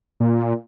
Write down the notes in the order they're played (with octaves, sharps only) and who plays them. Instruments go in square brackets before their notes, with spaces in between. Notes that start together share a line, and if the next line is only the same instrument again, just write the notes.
[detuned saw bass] A#2